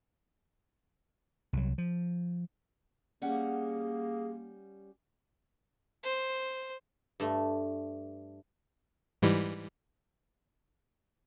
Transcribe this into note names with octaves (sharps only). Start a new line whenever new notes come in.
C2 F#3
F3
G3 A#3 C#4 G#4 F#5
C5
G2 A3
G#2 E3 G3